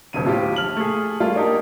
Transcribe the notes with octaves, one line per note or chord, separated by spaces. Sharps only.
D#1 B1 C#3 D#7
A2 F4 G4
A#1 F6 F#7
A3 G#4
G3 A3 A#3 F4
A#3 D4 D#4 G4 A#4